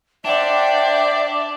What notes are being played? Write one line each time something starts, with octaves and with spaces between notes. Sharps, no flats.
D4 C5 D5 E5 F#5 G5